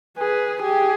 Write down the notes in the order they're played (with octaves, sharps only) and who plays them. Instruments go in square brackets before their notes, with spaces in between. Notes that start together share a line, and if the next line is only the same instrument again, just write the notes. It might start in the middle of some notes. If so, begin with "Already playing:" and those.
[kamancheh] G#4 [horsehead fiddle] B4
[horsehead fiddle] G4 [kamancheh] G#4